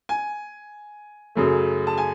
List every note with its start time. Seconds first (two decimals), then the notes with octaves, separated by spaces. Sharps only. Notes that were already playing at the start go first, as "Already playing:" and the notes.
0.09 G#5
1.35 F#2 C#3 F#3 A3
1.87 A5
1.98 G#5